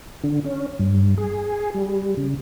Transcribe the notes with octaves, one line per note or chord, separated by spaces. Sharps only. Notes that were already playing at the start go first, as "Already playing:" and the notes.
D3
C#4
G2
G#4
G3
C#3